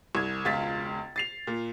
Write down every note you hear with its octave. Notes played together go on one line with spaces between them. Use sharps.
C2 G#6
E1 C#2 F4 A6 B6
A6 C7 F7
A#2